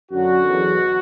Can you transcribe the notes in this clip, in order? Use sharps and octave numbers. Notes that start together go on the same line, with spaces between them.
F#2 D3 F#3 F#4
E2 B2 F#3